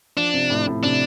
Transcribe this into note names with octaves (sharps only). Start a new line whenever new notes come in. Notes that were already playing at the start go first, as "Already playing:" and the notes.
F3 D4
C3
A2
A2
C3 D4